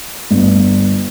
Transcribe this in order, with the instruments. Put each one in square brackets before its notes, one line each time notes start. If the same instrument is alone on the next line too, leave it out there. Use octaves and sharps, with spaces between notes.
[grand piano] G1